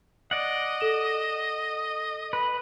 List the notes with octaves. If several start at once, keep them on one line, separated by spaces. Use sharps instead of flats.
D5 D#5 F#5
A4 E7
B4